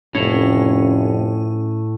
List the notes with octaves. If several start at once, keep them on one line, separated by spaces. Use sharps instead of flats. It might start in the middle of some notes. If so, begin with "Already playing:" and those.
F1 A2 C#4